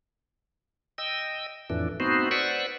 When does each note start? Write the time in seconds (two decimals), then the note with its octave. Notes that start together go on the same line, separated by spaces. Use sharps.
0.98 D#5 G5 E6
1.70 F2 A2 E3 D4
2.00 A3 B3 C4 D#4 F#4 C5
2.31 B4 C5 D5 F#5 C#6 E6